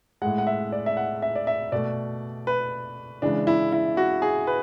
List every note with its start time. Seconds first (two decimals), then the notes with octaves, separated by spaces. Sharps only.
0.22 A2 G#3 F#5
0.38 F#5
0.47 E5
0.72 D5
0.86 E5
0.97 F#5
1.22 E5
1.35 D5
1.47 E5
1.72 B2 A3 D5
2.47 B4
3.22 C#3 E3 G#3 D4
3.47 E4
3.72 E4
3.97 F#4
4.22 G#4
4.47 B4